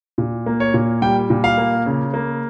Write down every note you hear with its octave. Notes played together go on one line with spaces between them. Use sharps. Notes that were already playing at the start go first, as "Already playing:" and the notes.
A#2
A#3
C#5
A#2
G3 G5
A#2
F5
A#3
C#3
A#3